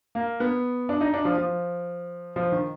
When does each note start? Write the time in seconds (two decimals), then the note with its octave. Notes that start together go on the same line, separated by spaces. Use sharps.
0.15 A#3
0.40 B3
0.89 D4
1.01 D#4
1.14 D4
1.25 F3
1.37 F3
2.36 F3
2.52 D#3